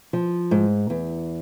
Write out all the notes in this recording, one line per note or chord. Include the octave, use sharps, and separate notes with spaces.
F3
G#2
E2